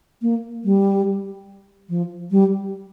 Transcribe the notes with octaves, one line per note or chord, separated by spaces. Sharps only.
A#3
G3
F3
G3